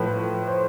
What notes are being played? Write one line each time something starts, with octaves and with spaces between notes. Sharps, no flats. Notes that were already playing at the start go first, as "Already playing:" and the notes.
Already playing: A2 F3 B4
C5